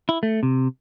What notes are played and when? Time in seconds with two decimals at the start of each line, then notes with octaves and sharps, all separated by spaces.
0.09 E4
0.23 A3
0.43 C3